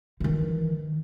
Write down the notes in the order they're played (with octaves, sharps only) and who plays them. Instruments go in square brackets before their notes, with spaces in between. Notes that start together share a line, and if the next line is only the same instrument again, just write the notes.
[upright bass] D#3 E3